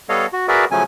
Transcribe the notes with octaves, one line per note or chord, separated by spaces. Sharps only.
G3 B3 A4 C#5 D#5 F5
F#4
F#4 G#4 A#4 B4 D5 E5
C#3 F3 F#3 A3 C#4 G#5